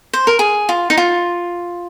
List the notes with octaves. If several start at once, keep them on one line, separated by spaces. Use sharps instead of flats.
C5
A#4
G#4
F4
D#4
F4